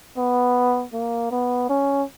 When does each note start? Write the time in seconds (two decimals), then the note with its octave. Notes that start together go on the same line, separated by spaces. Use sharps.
0.17 B3
0.93 A#3
1.31 B3
1.69 C#4